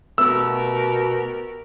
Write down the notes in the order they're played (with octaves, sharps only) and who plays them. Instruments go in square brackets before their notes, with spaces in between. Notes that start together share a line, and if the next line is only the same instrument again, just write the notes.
[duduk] B2 [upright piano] A3 B3 [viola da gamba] F#4 G4 A#4 [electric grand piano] E6